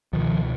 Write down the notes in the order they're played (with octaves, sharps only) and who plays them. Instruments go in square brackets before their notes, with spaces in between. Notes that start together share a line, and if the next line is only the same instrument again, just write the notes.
[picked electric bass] C#2 B2 D#3 F3